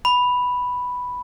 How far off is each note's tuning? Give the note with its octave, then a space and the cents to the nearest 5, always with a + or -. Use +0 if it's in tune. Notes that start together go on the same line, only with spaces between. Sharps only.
B5 +0